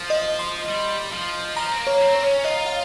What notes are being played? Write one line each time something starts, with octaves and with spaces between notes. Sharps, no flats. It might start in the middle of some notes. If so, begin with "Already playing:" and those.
Already playing: F3
D#5
C6
G3
F3
F3 A#5
C4
A#3
C#5
C4
C#5
C#4
F4 D#5
F5